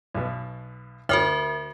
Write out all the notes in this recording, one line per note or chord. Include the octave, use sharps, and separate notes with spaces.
B1 B2
D2 F#4 A#4 C#5 E5 F6